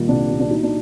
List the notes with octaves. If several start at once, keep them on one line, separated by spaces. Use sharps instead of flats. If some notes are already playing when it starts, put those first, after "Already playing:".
Already playing: A#2 D#3 G3
C2 D4
A#2
D4
F#3 D#4
D4